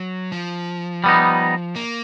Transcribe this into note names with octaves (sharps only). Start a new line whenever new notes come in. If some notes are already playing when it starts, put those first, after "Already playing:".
Already playing: F#3
F3
G3 B3 D#4
A#3